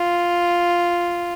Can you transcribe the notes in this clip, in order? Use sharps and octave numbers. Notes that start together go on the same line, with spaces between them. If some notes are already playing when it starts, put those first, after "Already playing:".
Already playing: F4